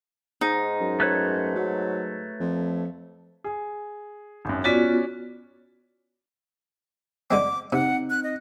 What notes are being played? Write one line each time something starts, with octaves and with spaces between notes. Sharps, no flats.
G#2 D#4
F#2
A3 B4 C#5
F#3
F2
G#4
G#1 F#2
B3 C#4 F4 F#4 D5 B6
D3 G#3 C4 D6
C3 C4 D#4 F#5
F#6
D#5